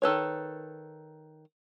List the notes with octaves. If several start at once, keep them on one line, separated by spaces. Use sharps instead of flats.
D#3 A4 B4 C#5